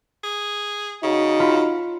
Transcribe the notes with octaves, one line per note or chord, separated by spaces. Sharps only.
G#4
C#3 D#4 F#4
F4 B5